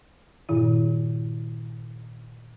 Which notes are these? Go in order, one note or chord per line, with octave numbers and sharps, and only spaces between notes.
G2 A#2 D#3 E4